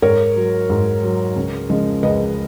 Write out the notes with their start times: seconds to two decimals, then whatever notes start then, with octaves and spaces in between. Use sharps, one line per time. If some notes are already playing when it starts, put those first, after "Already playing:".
0.02 G#2 A#4 C#5
0.36 F#3
0.70 G#2
1.03 F#3
1.36 C#2
1.70 C#3 F3 G#3
2.03 C#2 B4 D#5